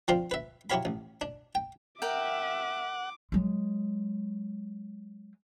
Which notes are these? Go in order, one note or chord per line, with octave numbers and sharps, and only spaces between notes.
F3 C4 D4 F4 C5
B4 E5
F#3 E4 G4 C#5 F5 B5
A1
D4
G5
A#4 E5 F#5 G5 D6
F#3 G#3